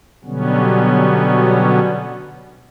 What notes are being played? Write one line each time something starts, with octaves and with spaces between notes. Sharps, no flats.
B2 D3 F#3 G3 B3 C#4